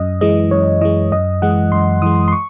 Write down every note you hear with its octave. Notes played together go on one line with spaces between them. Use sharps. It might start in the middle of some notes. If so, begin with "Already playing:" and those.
Already playing: F#2 D#5
E3 G#3 D#5
F#2 C#5
E3 G#3 D#5
F#2 D#5
E3 G#3 F#5
F#2 C6
E3 G#3 D#6
C6
C#6